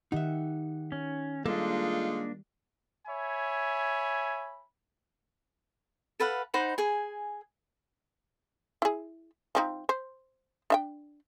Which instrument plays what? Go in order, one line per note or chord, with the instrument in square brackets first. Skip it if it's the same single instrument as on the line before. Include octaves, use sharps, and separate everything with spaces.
[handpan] D#3 G4 F#5 [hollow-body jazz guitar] D#4 E5
[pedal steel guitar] C#4
[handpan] G3 [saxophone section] G#3 D#4 F4 [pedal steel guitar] A#3 D4 [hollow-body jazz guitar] A4
[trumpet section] C#5 E5 G#5 B5
[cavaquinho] A4 B4 F5 F#5
D#4 C5 F#5 B5
G#4 G#5
[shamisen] E4 G#4
F3 C4 D#4
C5
D4 E5 G5